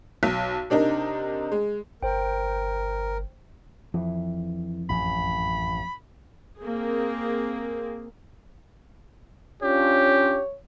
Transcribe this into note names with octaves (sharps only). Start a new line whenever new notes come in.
B1
C3 D4 D#4 A#4
G#3
G1 A#4 C5 G5
F2 E3
A1 F#2 B5
A#3 C4 G#4
C#4 D4 F4 G4 C#5